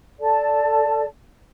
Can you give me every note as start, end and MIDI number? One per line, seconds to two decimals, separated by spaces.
0.20 1.05 69
0.20 1.05 74
0.20 1.05 81